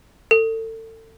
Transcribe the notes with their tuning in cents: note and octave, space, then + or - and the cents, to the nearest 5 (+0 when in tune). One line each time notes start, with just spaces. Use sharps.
A4 +30